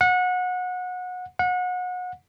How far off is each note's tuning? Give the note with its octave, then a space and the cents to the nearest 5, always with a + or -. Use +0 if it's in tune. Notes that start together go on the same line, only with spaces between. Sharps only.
F#5 -25
F#5 -30